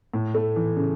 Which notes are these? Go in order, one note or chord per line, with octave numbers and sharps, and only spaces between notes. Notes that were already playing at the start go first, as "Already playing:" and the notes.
A2
A3
E3
C#3